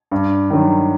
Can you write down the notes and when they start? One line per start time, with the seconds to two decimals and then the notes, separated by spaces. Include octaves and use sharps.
0.12 G2
0.50 D#3 F#3